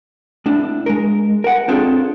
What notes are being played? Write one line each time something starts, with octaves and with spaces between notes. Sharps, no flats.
A2 D4
G#3 A#4
A#4 F#5
C4 D4 F4 G#4 A4 C#5